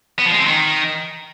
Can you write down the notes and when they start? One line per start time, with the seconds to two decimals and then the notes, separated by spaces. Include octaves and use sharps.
0.19 B3
0.26 F3
0.32 G#3
0.39 C4
0.45 D#3